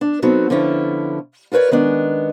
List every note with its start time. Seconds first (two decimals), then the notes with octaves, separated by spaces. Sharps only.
0.01 D4
0.22 F#3 B3 C4 D#4 F#4 A4
0.50 D3 F3 B3 C#4 E4
1.52 F4 A#4 B4 C#5 D5
1.71 D#3 G#3 B3 C#4 D4